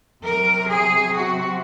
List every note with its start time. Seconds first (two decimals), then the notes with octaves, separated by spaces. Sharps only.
0.22 C3 F#3 A#4
0.68 G#4
1.14 F#4